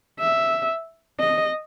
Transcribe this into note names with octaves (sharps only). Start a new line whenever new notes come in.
E5
D#5